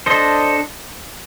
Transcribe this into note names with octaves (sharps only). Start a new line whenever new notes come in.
D4 A4 C5 D#5